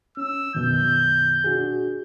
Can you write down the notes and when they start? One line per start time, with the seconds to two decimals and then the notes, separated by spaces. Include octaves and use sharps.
0.17 C#4 E6
0.55 F#2 B2 D#3 G6
1.44 D4 F#4 G#4